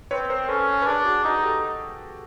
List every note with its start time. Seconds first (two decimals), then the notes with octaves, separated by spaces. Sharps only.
0.11 C4 B4 C#5
0.30 A#4 C5
0.49 C#4 A4 B4
0.82 B4
0.86 D4 G#4 A#4
1.05 F#4 G#4
1.24 D#4 F#4 G#4
1.43 G4 A4